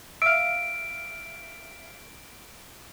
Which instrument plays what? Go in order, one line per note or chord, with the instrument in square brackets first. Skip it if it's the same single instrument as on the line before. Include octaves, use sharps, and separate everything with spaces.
[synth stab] E5 F5 [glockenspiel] D7